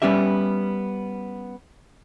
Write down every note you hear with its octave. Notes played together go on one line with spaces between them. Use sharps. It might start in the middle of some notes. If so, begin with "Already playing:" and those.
G3 B3 C#4 G4 E5